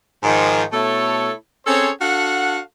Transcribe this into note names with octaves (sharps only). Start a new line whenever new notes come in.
G#2 D#3 F3
B2 A3 E4 A4 C#5
C4 C#4 G#4 A4 C5 C#5
D4 F#4 A4 F5 F#5